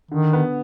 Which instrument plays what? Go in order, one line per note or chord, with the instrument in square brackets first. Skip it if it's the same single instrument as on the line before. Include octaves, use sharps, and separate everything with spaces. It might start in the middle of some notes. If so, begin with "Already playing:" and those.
[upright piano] D3 [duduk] D#3
[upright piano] B3